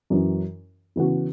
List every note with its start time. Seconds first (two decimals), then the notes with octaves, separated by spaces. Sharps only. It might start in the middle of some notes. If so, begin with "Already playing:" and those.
0.10 F#2 E3 C#4
0.96 C#3 E3 B3 F#4